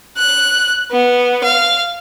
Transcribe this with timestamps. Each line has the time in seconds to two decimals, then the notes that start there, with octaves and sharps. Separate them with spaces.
0.18 F#6
0.91 B3
1.44 F5